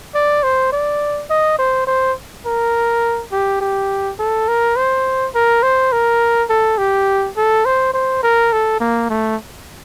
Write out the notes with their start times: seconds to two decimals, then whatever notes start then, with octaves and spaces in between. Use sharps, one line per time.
0.15 D5
0.43 C5
0.72 D5
1.30 D#5
1.58 C5
1.87 C5
2.46 A#4
3.32 G4
3.61 G4
4.19 A4
4.48 A#4
4.76 C5
5.35 A#4
5.63 C5
5.92 A#4
6.50 A4
6.78 G4
7.37 A4
7.65 C5
7.93 C5
8.23 A#4
8.52 A4
8.80 A#3
9.10 A3